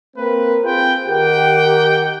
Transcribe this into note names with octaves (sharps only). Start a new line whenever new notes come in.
A#3 C4 A#4 B4
C4 F4 G#4 B4 G5
D#3 G4 A#4 F#5 G5